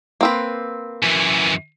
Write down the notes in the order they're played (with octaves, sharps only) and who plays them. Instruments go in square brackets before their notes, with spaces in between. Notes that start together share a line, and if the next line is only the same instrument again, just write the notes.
[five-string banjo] A#3 C4 B4
[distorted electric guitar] F#2 E3